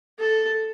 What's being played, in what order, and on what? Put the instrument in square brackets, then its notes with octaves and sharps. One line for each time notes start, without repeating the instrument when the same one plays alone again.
[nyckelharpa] A4